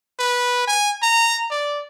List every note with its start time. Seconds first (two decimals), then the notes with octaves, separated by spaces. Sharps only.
0.19 B4
0.67 G#5
1.02 A#5
1.51 D5